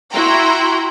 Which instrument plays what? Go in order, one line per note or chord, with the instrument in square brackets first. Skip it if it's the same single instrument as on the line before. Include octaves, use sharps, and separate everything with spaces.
[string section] E4 F#4 G5 A#5 C6